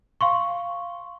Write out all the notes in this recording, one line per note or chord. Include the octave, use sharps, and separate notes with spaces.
F5 C6 C#6